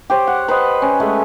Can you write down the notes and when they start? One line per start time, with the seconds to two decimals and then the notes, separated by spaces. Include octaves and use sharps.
0.10 G4 C5 C#5
0.27 F#5
0.48 B4 C5 D#5
0.82 C#4
1.00 G#3 A3